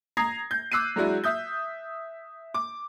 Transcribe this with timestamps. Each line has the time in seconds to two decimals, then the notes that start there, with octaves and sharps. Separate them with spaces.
0.17 A#5 D#6 G#6 A#6 C7
0.51 G6
0.71 D6 E6 F#6 C7 D#7
0.96 F#3 G#3 D4 E4 F#4
1.24 E5 D#6 G6
2.54 D6